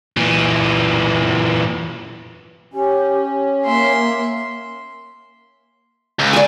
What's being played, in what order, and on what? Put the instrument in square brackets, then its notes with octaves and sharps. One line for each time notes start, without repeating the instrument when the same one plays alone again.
[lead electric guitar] A#2 E3
[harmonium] C#4 [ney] G4
[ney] A#3 [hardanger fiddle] E5 C6
[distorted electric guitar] C#2
[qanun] D5 G#5